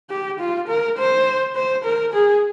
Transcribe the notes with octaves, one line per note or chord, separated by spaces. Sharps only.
G4
F4
A#4
C5
C5
A#4
G#4